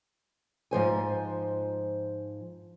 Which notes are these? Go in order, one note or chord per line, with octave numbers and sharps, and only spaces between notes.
G#2 F3 C5 G#5